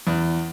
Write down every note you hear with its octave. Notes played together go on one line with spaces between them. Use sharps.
E2